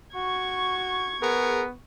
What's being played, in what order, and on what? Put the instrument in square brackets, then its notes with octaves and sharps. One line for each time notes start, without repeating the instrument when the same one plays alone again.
[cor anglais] F#4 [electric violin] C#6 G#6
[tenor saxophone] B3 [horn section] G#4 A#4